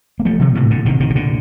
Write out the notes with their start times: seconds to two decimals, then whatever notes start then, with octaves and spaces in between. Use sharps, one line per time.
0.20 A#3
0.25 F3 A3
0.40 C3 D#3
0.55 A2 C3
0.70 A#2 D3
0.86 C3 D#3
1.00 C3 D#3
1.10 C3
1.15 A#2 D3